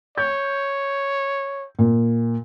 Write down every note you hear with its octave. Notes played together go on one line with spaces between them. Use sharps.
C#5 G6
A#2